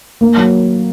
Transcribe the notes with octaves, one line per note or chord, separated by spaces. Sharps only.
A#3
F#3